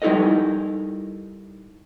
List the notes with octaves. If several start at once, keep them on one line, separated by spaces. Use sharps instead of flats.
G3 D#4 E4 A4 A#4 D#5